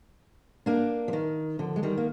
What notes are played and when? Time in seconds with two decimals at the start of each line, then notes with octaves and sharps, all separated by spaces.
0.66 A#3 D4
1.08 F3
1.13 D#3
1.59 D3 F3
1.76 G#3
1.83 D#3 G3
1.98 A#3